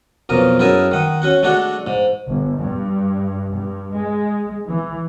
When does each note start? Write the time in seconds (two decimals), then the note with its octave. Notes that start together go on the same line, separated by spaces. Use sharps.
0.29 B1 F2 A#4 D#6
0.59 F#2 E4 G#4 A#4 A5 D#6
0.91 D#3 F#5 D#6
1.22 C#4 F#4 F#5
1.43 G#3 A3 D4 F#4 F#5
1.87 G#2
2.28 G1
2.59 G2
3.54 G2
3.94 G#3
4.67 E3